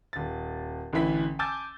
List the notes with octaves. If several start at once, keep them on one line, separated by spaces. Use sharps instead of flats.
D#1 A6
A1 D3 E3 E4 B6
G#5 A5 D6 E6 G6 A6